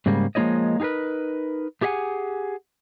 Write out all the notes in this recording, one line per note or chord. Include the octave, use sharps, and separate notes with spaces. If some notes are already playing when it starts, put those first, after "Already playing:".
G#2 C#3 G3 A#3
F3 G#3 A#3 E4 C#5 D#5
D#4 F#4 G#4 A#4 B4
A3 G4 G#4 E5 F#5 G#5